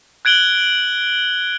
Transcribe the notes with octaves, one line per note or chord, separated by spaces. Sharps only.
F#6 G#6 D7 F#7 G7